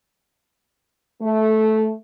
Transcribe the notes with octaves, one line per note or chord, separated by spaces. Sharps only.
A3